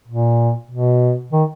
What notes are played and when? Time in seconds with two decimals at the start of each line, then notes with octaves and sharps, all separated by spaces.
0.08 A#2
0.71 B2
1.33 D#3